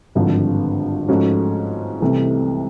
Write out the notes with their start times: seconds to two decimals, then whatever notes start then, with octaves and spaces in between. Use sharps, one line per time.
0.15 G#1 G2 D3 F3
1.08 G#2 F3 A3 C#4 F#4
2.01 C2 C3 E3 A3